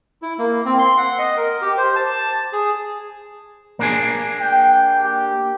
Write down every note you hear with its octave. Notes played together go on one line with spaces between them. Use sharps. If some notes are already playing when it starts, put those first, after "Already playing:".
E4
A#3
C4
C6
F#5
D#5
A#4
G4
C5
A5
G#4
A#3 D4 G#4
G5
G4